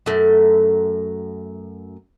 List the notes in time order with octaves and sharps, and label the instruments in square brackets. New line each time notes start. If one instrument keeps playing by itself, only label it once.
[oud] F#2 A3